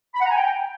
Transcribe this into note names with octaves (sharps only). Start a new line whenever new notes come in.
B5
F#5
A#5
G#5
G5